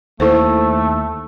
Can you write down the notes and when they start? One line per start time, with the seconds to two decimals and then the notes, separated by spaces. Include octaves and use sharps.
0.20 D#2 A3 E4 A4 C5